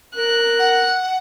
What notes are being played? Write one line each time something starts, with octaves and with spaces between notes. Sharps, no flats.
A#4 F#6
F#5